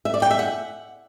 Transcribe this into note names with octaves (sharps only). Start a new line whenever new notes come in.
E5
D5
G5
E5
F#5